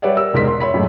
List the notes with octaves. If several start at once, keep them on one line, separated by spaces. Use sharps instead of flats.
G3 B4 C#5 D5 E5 F#5
A#4 E6 E7
E1 G#2 A#4 C6 B6
C6
C#5 E5 B5 B6
F#2 A2 F#3 G#3